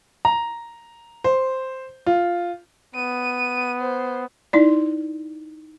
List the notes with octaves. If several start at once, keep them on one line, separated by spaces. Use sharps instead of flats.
A#5
C5
F4
B3 D#7
C5
D#4 E4 D5